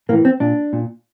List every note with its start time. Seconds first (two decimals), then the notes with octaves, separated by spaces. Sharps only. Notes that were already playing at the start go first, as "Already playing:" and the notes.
0.09 A2 A#3
0.13 E3
0.25 C4
0.40 A#2 D4
0.73 A#2